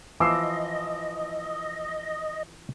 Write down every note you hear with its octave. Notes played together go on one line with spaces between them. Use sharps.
E3 F3 D#5 D6 E6 C7